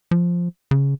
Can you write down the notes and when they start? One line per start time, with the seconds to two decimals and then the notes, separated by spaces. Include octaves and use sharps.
0.11 F3
0.71 C#3